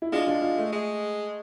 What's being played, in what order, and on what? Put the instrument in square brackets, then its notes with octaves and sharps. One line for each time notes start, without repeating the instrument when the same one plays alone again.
[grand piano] E4
[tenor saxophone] G#3 [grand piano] D4 F4
[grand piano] D4 F4
D4 F4
A3
[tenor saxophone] G#3